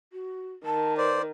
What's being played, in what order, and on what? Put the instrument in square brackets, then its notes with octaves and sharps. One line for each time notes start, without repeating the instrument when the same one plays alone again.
[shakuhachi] F#4
[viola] D#3 [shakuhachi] A5
[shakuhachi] B4 [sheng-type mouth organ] C5 D5